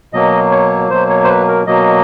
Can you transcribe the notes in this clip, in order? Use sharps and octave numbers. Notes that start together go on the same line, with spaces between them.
B2 F#3 A#3 D#5
C#5
B2 F#3 A#3 C5
C#5
C5
B4
A#4
B2 F#3 A#3 D#5